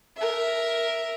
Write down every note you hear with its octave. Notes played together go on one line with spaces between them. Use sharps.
A#4 E5